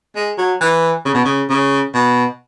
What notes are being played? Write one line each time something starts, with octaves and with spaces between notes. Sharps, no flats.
G#3
F#3
E3
C#3
B2
C#3
C#3
B2